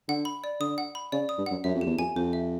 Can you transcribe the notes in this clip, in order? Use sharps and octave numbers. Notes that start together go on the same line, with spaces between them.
D3 F#5
B5
D5
D3 D#6
F#5
B5
C#3 D5
D#6
G2
F#2 F#5
F#2 E5
F2
G4
E2
F2 G#5
F2 C5
E5